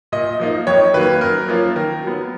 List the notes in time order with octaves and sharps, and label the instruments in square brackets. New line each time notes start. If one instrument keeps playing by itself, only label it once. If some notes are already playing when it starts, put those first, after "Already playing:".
[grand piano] A#2 D#5
F3 A#3 D#4
F2 C#5
D#3 F#3 A#3 B4
F#2 A#4
F3 A#3 C#4 F4
D#3 A#4
F#3 B3